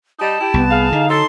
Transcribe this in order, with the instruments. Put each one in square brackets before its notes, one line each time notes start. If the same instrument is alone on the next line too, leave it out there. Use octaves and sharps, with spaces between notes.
[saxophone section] G3 D#4 [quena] A5
[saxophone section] E4 G4
[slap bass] C2 [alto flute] B3
[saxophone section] G#4 F5
[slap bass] D3 [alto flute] D#4
[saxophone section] F#3 A4 [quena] C6